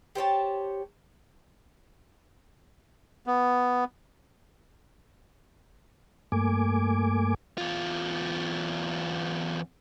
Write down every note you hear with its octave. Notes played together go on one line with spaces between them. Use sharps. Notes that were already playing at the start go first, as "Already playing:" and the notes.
G4 C5 C#5 A5
B3
G2 A3 A#3 G#5 D6
E2 F4